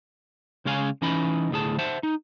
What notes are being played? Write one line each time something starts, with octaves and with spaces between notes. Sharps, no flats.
C#3 G#3 C#4 F5 G5 G#5
E3 C#4 D#4 D#5 B5
D2 A2 G#4 A5
C5 E5 F#5 A5
D#4